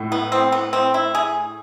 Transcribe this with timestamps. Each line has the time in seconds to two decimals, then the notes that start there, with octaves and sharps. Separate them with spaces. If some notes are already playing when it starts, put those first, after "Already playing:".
Already playing: A2
0.12 B3
0.32 C4
0.52 B3
0.73 C4
0.94 E4
1.15 G#4